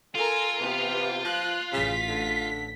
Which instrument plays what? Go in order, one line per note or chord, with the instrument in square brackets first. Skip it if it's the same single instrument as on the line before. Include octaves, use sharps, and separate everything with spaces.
[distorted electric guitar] F4 [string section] A4 A#4 G#5
[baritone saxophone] C3 [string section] E3 B3 G4
[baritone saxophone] F3 [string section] F#6
[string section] A1 B6 [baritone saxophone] C#3
[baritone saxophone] D3